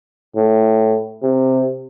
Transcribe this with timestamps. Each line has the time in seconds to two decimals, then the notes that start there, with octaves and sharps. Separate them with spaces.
0.36 A2
1.22 C3